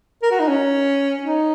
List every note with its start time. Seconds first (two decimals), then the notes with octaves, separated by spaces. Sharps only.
0.23 A#4
0.31 F#4
0.40 D#4
0.48 C#4
1.23 D#4